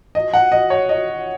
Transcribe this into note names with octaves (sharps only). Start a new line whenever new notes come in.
D#5
F#5
D#5
C#5
D#5